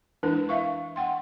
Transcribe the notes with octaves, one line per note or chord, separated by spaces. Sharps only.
E3 G#3 D4 E4 A#4 B4
E5 F5 C#6
F#5 G5 C6